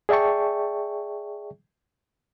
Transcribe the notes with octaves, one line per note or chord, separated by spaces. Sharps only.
G#4 D5 E5 G5 A5 C#6